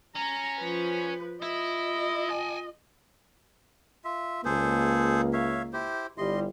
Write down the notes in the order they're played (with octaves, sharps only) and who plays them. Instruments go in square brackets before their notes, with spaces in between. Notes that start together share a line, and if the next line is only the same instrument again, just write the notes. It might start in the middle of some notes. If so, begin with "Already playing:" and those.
[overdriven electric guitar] C#4 [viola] A#5
[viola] F3 B4
[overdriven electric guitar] E4 [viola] F4 D#5
[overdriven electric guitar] G#5 A5
[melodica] F4 E5
[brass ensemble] C#2 A#3 [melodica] G#4 A4 C5
[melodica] C#5 E5 F5
E4 G4 C5
[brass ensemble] G1 G3 E4 [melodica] D#5 C6